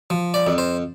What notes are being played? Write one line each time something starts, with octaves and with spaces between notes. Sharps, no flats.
F3
D5
F2
C5